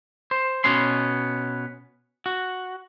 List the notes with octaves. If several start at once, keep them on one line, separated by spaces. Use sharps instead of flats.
C5
B2 B3 C#4 C6
F#4